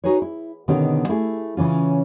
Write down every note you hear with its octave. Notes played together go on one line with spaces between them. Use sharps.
D#4 F#4 G#4 B4 C#5
E4
B2 D3 D#3 B3 C#4 G4
A3 E4 G4 G#4
C#3 E3 C#4 F4